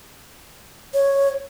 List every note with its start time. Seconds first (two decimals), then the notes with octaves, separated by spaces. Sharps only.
0.94 C#5